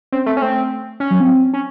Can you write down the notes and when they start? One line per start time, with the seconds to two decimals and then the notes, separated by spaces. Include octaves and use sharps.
0.12 C4 C#4
0.26 A3 C4
0.37 C#4
0.41 A3 C4
1.00 C#4
1.10 F#3
1.20 C4
1.54 C#4